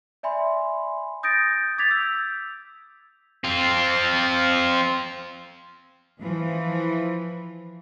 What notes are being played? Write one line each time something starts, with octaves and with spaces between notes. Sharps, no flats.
D5 E5 G#5 B5 C6
D#6 G6 A6 A#6 D7
D6 G#6 A6 B6 F7
E6 G6
C4 F4
E3 F3